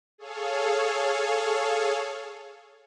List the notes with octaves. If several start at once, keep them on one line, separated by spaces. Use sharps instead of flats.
G#4 A4 C#5 F5